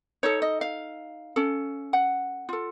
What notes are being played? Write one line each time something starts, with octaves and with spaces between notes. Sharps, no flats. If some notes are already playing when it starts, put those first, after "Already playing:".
D#4 A4 C#5
D#5
F5
C#4 A4
F#5
F4 A4